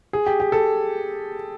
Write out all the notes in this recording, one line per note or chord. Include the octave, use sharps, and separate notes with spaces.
G#4
G4
G4
A4